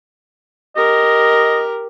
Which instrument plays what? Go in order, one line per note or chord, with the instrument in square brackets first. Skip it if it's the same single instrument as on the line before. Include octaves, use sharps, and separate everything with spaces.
[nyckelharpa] G4 A#4 [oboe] D#5